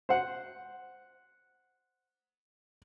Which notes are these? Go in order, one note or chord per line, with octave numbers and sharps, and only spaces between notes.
C5 F#5